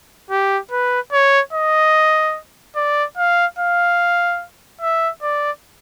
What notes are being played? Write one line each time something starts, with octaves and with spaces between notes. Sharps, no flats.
G4
B4
C#5
D#5
D5
F5
F5
E5
D5